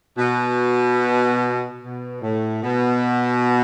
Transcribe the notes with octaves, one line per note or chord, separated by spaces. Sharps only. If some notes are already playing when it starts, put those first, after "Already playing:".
B2
B2
A2
B2